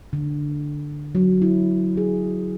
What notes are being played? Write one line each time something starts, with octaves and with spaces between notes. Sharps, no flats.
D3
F#3
E4
G#4